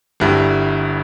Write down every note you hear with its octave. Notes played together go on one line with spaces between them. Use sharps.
G1 G2 G3 E4